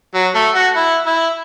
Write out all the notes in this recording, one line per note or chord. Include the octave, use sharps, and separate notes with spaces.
F#3
A3
F#4
E4
E4